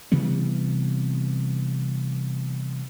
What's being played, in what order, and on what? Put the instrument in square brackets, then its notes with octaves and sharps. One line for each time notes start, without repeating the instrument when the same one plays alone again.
[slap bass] C3 E3 G3 B3